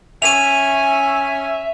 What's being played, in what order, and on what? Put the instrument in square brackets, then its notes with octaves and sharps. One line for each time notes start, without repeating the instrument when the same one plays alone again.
[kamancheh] C#4 G#5 [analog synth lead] E5 [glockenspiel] D#7 F7